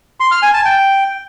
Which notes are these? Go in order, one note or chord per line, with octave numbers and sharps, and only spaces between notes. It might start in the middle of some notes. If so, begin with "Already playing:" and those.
C6
F6
G#5
A5
G5